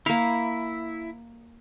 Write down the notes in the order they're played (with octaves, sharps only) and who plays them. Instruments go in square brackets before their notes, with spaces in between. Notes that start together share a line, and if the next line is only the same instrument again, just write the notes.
[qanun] A#3 F5 [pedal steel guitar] E4